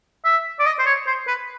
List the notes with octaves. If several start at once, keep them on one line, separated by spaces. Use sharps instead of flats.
E5
D5
D#5
C5
C#5
C5
B4